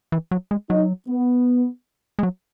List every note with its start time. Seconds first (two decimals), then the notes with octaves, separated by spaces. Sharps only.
0.12 E3
0.31 F#3
0.51 G#3
0.70 F#3 D#4
1.08 B3
2.19 G#3
2.23 F#3